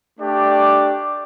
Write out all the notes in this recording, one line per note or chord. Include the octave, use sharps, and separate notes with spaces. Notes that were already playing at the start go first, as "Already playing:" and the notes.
A3 D4 G4 D5